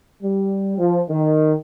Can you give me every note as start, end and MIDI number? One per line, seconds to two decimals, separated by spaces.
0.22 0.77 55
0.78 1.01 53
1.09 1.54 51